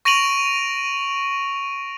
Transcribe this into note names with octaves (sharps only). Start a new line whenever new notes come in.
C#6 A#6 D7 D#7 F7 F#7